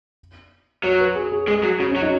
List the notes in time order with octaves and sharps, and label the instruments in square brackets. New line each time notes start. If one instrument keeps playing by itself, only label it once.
[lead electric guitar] F#3 [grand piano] C#5
[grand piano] B4
G#4
G#4
[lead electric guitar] G#3 [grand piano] G#4
[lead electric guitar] F#3
[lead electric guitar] C#3 [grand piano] F#4
[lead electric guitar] F#3 [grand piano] C#4
[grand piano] D#4